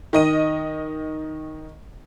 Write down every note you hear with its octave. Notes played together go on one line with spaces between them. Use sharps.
D#3 D#5 D#7